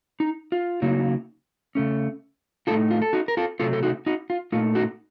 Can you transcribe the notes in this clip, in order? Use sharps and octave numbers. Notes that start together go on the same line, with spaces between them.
D#4
F4
C#3 F#3 A#3 D#4
C#3 A3 C#4
A2 A3 D#4 F4 A4
F4
A4
D#4 F#4
A#4
F4 A4
C3 F#3 A3 F4 A4
A4
D#4 F#4
D#4 F#4
F4
A#2 A3 D#4 F4
D#4 F#4